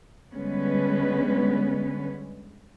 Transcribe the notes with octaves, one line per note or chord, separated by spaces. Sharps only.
D3 G3 G#3 B3 C#4 B4